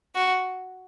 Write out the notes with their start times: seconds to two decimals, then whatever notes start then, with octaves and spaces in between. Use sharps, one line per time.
0.15 F#4